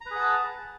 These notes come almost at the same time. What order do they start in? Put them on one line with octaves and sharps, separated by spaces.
A#5 B4 G#4 F#5 A5